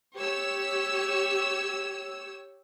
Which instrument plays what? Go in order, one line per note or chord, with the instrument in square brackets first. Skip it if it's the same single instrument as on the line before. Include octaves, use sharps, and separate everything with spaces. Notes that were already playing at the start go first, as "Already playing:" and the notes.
[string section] G4 C#5 E6